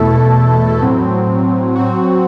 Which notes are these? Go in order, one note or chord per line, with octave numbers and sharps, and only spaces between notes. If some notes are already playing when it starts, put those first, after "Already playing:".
Already playing: E2 B2 A3 E4 A4
A2 F#3 C4
F#3 C4 F#4